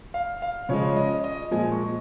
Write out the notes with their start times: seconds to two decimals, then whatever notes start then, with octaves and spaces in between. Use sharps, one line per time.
0.14 F5
0.42 F5
0.69 C#3 F3 G#3 C#5
0.96 D#5
1.24 D#5
1.51 A#2 F3 G#3 G#5
1.72 C#6